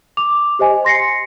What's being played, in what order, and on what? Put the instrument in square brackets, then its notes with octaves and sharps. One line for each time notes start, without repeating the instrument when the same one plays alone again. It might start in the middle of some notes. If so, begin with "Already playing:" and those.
[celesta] D6 F7
G4 C5 D#5 G#5
C6 A#6 C7 C#7